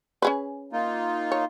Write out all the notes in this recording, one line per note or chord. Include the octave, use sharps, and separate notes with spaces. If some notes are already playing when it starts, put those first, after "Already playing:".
C#4 G#4 B4
A#3 D#4 F4
C#5